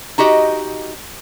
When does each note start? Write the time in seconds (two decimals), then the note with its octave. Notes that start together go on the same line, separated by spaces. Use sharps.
0.18 D#4 F#4 G4 D#5